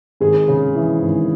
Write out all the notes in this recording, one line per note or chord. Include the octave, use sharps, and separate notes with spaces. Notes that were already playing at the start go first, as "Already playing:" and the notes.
G#1 G#3 G#4
C#3
E3
G#1